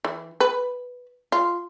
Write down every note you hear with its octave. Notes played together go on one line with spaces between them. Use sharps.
E3
B4
F4